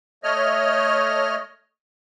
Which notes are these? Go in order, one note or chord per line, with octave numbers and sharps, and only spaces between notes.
A3 C#5 D#5 F6